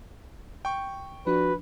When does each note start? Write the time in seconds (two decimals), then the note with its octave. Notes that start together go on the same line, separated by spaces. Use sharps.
0.65 G5 C#6
1.26 F3 D4 F#4 B4